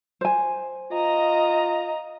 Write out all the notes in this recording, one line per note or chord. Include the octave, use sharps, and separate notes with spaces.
C5 G#5
F4 D#5 A#5